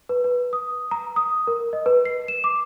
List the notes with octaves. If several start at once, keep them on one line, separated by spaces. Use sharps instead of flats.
B4
B4
D#6
A#5
D#6
A#4
D#5
B4
C7
E7
D6